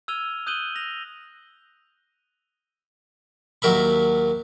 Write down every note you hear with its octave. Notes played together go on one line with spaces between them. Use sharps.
E6 F6 G#6 D#7 F7 G7
D#6 F#6 G6 D#7 F#7 G7
A#6 F7
D#2 F#3 A#4 E5 B5